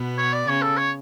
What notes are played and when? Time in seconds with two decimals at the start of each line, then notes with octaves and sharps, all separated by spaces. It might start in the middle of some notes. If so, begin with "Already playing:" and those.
Already playing: B2 B3
0.18 C#5
0.33 D5
0.47 C#3 C#5
0.62 A4
0.77 C#5